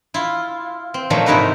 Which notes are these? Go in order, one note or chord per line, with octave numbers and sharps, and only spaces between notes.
E4 F4
C4
A#2 D#3 F3 F#3 A3
G#2 C3 D#4 E4 A#4 B4